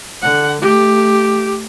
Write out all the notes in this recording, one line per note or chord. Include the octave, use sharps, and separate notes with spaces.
D3 F#5
A3 G4